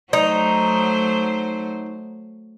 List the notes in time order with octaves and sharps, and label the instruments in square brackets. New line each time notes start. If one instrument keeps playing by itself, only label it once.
[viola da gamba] F#3 A3 C5 [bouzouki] D#4